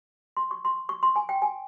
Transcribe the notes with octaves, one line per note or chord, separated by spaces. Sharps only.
C6
C#6
C6
C#6
C6
G#5
G5
G#5